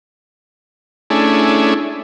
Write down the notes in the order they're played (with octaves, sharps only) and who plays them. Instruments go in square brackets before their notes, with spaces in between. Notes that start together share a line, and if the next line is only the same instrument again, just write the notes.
[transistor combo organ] A3 C#4 D4 E4 G#4